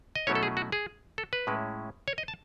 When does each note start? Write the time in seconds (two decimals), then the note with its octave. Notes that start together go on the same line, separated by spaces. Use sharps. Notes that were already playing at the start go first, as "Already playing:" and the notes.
0.15 D#5
0.27 B2 F#3 A3 C#4 E4 C#5
0.35 A4
0.43 G#4
0.57 F#4
0.72 G#4
1.18 A4
1.33 B4
1.47 A2 G#3 C#4 E4
2.08 C#5
2.18 D#5
2.28 A5